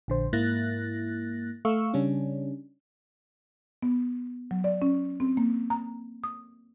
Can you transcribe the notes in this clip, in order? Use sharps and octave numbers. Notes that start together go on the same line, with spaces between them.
A#1 D3 C5
G#2 A#3 E4 F#6 A6 A#6
A3 F5 C#6 E6
C#3 G3 C#4 D4
B3
F#3
D5
C#4
C4
A#3
A#5
D#6